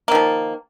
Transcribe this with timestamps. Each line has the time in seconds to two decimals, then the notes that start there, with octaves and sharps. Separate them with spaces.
0.08 A#3
0.11 D#3
0.15 F3